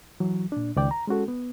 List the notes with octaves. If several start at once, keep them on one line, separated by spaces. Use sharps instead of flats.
E3 F#3
A#2 D4
C#2 D#3 D5 G5
A#5
G#3 C#4 F#4 A4
B3